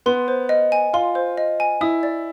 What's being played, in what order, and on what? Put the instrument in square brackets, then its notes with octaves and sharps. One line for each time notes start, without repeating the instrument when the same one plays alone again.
[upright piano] B3 [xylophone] C6
[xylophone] C5
D#5
G#5
[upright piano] F4 [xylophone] C6
[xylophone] C5
D#5
G#5
[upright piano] E4 [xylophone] D#6
[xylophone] D5